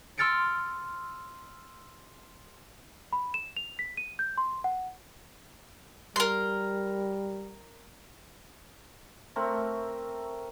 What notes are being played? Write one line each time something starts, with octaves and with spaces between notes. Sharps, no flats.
C6 E6 F6 A6 C#7 D7
B5
E7
F7
B6
D#7
G6
C6
F#5
G3 A#4 C6
A3 C4 A#4